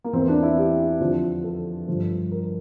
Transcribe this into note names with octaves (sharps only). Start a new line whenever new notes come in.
A#3
E2 E3 C4
D4
E4
G4
F2 D3 F3
A4
G2 D3 F3
A#4